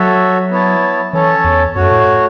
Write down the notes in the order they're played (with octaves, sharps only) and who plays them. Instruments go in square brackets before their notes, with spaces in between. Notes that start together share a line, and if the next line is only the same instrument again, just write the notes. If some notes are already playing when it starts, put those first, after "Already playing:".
Already playing: [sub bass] F#3 [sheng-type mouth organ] F#4 A4 C#5 E5
[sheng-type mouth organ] B3 E4 C#5 A5
[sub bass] E3 [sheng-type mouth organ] C#4 A4 C#5 A5
[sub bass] E2
[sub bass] F#2 [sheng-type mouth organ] A3 F#4 C#5
[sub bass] A2